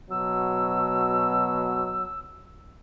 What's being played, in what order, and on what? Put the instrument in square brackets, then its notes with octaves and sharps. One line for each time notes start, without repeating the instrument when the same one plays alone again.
[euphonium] B2 [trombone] F#3 [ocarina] E6